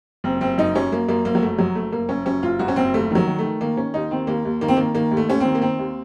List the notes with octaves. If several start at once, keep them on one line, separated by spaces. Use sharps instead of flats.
F#1 C4
F#1 C4
F#2 D#4
F#2 C#4
F#2 A#3
F#2 A#3
F#1 A#3
F#3
F#2 A3
F#2 F#3
F#1 A3
F#1 A#3
F#1 C#4
F#2 C#4
F#1 F4
F#2 F#4
C#4
F#1 C4
D#2 A3
D#3 F#3
D#3
D#3 A3
D#3 A#3
D#3 C#4
D#2 D#4
D#3 C4
D#2 A#3
D#2
D#3 A#3
C4
D#3 A#3
D#3 A#3
D#2
A3
D#2 C#4
D#3 C4
A#3
D#3 C4
D#2